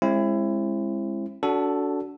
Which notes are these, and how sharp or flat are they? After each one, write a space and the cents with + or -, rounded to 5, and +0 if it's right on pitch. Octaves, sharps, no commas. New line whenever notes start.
G#3 -15 C4 +40 E4 +25
D4 -30 F#4 +5 A4 +0